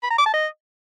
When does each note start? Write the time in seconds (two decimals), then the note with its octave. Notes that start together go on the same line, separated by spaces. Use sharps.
0.03 B5
0.11 A#5
0.18 D6
0.26 A5
0.34 D#5